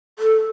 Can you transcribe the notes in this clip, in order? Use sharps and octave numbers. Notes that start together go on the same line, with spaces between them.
A4